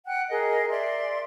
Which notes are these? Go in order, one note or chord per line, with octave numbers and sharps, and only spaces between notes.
F#5 G5 F#6
G#4 A#4 D#5
D5 E5 C6